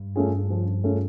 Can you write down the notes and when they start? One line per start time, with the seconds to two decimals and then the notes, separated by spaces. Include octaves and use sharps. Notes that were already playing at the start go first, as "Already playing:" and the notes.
Already playing: G2
0.16 A3 C#4 F4 G#4
0.50 F3
0.84 A3 C#4 F4 G#4